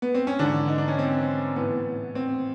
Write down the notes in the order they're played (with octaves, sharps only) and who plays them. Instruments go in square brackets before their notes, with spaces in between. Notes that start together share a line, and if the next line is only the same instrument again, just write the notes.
[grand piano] B3
C4
C#4
G#2 D3 E3 D4
D#4
D4
C#4
C4
A2 E3 B3
C4